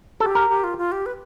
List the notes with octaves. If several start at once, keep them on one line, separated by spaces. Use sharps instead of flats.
G4 A4
A#4
G4
F4
F4
G4
B4